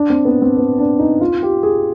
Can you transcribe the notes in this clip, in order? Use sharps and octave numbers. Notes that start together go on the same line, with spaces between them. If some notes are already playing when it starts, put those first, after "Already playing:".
Already playing: D4
C4
B3
C4
B3
D4
D#4
F4
G4
G#4